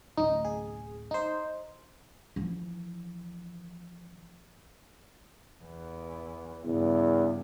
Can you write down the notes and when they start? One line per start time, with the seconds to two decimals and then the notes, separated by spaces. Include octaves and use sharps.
0.17 D1 A1 D#4
0.45 G#4
1.11 D#4 C5
2.36 E3 F3
5.64 E2
6.65 E2 G2 C#3